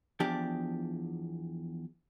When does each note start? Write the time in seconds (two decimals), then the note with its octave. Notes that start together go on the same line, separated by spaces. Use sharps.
0.20 E2 F3 D4 G4 D5